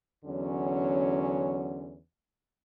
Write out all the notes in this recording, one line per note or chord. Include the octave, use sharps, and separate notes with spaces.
E2 D3 F#3 C#4